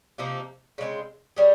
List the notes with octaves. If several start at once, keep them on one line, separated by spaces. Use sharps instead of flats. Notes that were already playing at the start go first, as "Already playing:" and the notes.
C3 F3 A#3 D#4
C#3 G#3 C4
G3 C#4 G#4